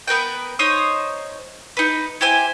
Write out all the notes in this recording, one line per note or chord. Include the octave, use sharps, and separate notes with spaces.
B3 A#4 B4 G5
D#4 C5 C#5 D#6
D#4 B4
E4 G4 C5 G#5